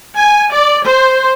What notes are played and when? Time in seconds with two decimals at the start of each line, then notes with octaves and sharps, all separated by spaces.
0.16 G#5
0.52 D5
0.85 C5